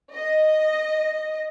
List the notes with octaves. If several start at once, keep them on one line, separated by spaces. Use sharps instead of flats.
D#5